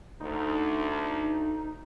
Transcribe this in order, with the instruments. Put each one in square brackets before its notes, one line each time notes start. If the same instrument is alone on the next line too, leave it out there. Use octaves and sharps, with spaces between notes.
[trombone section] D2 [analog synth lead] D#4